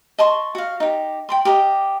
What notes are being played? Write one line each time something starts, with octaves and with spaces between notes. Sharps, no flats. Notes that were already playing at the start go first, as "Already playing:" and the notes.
D#5 A5 C6 C#6
F#4 F5
D#4 G4
G5 B5 C6
G4 A#4 D#5